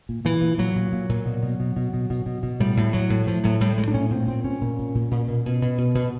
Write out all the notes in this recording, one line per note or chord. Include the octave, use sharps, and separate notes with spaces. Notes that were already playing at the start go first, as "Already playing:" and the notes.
A#2
A#2 E3
A#2
A#2 F#3
A#2
A#2
A#2
B2
B2
B2
B2
B2
B2
B2
B2
A2 G3
A2
A2 F#3
A2
A2 F3
A2 F#3
A2 G3
A2 G#3
D4
A#2 C#4
A#2 C4
A#2 C4
A#2 C#4
A#2
A#2
A#2
A#2
B2
B2
B2
B2
B2